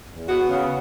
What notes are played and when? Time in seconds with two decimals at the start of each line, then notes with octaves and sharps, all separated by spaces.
0.11 E2
0.29 B3 F#4
0.49 C#3